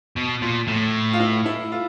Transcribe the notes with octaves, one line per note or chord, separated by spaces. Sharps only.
B2
A#2
A2
F4
E4
E4
F4